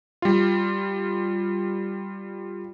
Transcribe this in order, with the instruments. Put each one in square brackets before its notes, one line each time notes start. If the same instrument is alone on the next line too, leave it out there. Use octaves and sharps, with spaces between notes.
[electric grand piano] G3 F4